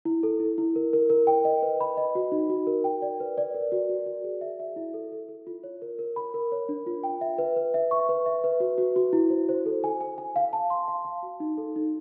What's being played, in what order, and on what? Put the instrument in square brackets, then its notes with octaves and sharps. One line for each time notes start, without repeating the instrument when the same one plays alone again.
[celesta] E4
A4
E4
E4
A#4
A#4
A#4
G5
D#5
B4
B5
D#5
F#4
D#4
F#4
A#4
G5
D5
B4
D5
A#4
F#4
F#4
F#4
G#4
E5
E5
E4
A4
A4
A4
F4
C#5
A#4
A#4
B5
A#4
C#5
D4
F4
G5
E5
B4
B4
E5
C#6
B4
E5
B4
F#4
F#4
F#4
E4
C5
C5
A4
G#5
G#5
G#5
F5
A5
C6
F5
F5
F#4
D#4
A4
D#4